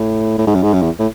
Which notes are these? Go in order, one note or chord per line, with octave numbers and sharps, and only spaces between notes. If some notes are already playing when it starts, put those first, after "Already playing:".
Already playing: A2
A2
G#2
F#2
G#2
F#2
E2
A2